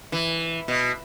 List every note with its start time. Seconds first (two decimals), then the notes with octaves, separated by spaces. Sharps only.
0.12 E3
0.68 B2